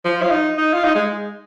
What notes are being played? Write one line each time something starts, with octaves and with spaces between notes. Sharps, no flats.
F3
F4
D#4
D#4
F4
D#4
G#3